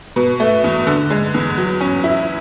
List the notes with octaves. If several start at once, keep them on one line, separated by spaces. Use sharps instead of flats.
B2
A3
E2
D3
G#3
E2
F#3
C#4
E4